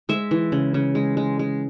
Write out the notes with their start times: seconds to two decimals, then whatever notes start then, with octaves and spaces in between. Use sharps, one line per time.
0.09 G#3 E5
0.31 E3
0.52 C#3
0.74 C#3
0.95 G#3
1.17 G#3
1.39 G#3